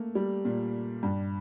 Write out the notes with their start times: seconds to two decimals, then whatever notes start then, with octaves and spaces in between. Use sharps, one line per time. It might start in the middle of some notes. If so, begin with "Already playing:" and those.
Already playing: A3 A#3
0.15 G3
0.45 A#2
1.03 G2